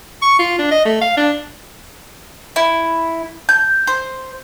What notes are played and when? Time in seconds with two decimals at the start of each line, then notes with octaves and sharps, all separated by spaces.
0.22 C#6
0.39 F4
0.59 D4
0.71 D#5
0.85 A3
1.01 F5
1.17 D4
2.56 E4
3.49 G6
3.87 C5